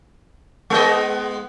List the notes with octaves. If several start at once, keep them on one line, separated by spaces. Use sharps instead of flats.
G#3 B3 D#5